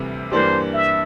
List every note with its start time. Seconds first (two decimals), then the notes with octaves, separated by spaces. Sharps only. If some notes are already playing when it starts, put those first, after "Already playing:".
Already playing: D2 C3 E3 G3 C4
0.32 G2 E3 A#3 D4 G4 C5
0.74 E5